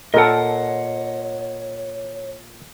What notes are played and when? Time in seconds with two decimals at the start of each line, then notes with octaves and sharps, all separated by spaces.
0.14 A#2 A4 A#4 C#5 D#5 F#5